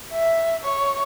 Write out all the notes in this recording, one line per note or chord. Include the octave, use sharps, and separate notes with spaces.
E5
C#5